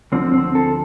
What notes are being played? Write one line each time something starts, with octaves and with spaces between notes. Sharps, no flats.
D2 D3 F3 C4
C4
A4